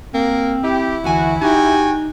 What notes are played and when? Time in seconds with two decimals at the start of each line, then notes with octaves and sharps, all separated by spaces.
0.14 A#3 C4
0.64 E4 G4
1.04 D2 E3 F#4 G#5
1.42 D#4 F#4 G4 G5 G#5